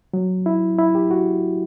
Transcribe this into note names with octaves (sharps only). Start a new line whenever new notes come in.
F#3
E4
E4
G4
F#4